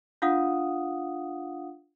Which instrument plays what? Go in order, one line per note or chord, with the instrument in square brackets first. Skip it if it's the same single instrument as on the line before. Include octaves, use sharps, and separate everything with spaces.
[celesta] D4 F4 F5 F#5 D#6